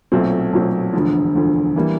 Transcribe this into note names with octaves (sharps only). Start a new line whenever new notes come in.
B1 A#2 F#3 A3 C4
B1 A#2 F#3 A3 C4
E1 D2 D3 F3
E1 D2 D3 F3
E3 G3 A#3